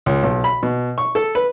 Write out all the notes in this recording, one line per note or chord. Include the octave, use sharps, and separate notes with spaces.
C#2
B1
B5
B2
C#6
A4
B4